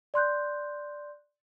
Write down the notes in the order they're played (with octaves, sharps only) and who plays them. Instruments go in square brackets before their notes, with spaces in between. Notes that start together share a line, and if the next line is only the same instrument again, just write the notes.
[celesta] D5 C6 F#6 G6